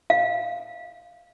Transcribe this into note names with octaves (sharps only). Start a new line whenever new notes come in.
F5